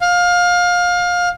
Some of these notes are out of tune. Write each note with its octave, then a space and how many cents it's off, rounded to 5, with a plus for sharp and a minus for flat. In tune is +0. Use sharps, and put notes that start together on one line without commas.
F5 +25